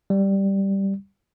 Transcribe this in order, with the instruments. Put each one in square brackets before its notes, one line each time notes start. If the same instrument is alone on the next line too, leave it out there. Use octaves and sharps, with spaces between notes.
[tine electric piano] G3